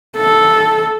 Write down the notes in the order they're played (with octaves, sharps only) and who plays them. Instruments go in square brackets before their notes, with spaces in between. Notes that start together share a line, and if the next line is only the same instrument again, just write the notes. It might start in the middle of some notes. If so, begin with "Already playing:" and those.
[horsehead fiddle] A4